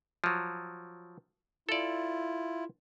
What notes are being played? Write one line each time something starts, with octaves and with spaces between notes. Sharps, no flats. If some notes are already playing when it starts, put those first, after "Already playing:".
F3 F#3
E4 F4 A4 D5